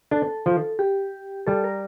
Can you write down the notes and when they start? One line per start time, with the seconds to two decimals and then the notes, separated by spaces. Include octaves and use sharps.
0.11 D4 A4
0.46 F3
0.79 G4
1.47 G3 A4
1.64 A#4